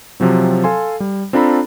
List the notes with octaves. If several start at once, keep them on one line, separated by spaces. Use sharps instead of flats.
C3 F3 F#3 C4
A4 F5 G#5 C6
G3
C4 D4 F4 A4 A#5 B5